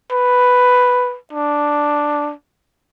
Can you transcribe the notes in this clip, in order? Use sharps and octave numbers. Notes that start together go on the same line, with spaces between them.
B4
D4